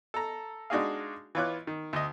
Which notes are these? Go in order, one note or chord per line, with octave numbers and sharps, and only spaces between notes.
A4 A#5
G#3 D4 D#4 F#4 G#4 F5
E3 B3 F4 C#5 D6 F#6
D#3
D2 D#5